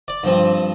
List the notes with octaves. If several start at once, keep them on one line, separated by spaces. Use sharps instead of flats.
D5
G2 F3 C4